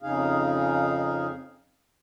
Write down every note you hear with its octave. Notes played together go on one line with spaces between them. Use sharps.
F2 C#3 D#4 G#4 F5